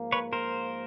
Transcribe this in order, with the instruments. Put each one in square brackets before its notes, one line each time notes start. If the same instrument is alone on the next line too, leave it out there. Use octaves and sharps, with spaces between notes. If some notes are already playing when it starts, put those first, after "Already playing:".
Already playing: [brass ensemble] G#2 F3 A#3
[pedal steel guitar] B4 C#5
A#4 C5